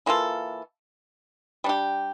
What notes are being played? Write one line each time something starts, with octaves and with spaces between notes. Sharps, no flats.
E3 A#3 F4 A4
G3 D4 G4